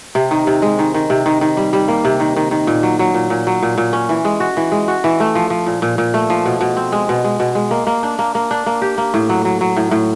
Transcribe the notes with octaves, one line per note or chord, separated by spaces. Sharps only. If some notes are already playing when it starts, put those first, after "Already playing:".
C3
D#3
C3
G#3
D#3
D#3
C3
D#3
D#3
G3
G3
A#3
C3
D#3
D#3
D#3
A#2
F#3
F#3
A#2
A#2
F#3
A#2
A#2
C#4
E3
G#3
F#4
E3
G#3
F#4
E3
A3
F3
F3
A#2
A#2
A#2
A3
F3
B2
B2
C4
G#3
B2
G#3
B2
G#3
A#3
A#3
D4
A#3
A#3
D4
A#3
G4
A#3
A2
F#3
F#3
F#3
A2
A2